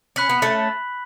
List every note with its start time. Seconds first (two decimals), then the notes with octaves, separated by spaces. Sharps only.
0.16 C#4 B5 F#6 B6 F#7
0.30 B3
0.42 A3 C#4